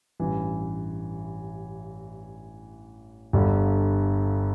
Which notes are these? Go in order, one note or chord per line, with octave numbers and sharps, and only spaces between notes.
A1 G2 E3
G1 G2 D3